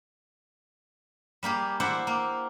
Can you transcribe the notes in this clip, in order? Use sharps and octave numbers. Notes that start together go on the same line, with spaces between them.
G3 A#3 G4 G#4
E4 G4 C5 D5 F#5
A#3